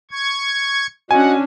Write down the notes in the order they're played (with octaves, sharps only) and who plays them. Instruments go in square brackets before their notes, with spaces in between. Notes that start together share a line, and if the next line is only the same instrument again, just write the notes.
[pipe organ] C#6 G#6
[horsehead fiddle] C#4 D4 [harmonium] F#4 D#5 [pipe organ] F#5 [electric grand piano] G#5